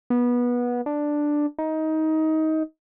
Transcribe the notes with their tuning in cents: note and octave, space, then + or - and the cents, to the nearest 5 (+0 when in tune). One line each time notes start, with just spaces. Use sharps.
B3 -20
D4 +5
D#4 +20